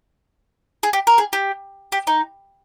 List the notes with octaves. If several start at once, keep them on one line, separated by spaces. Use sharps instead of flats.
G#4
G4
A#4
G#4
G4
G4
D#4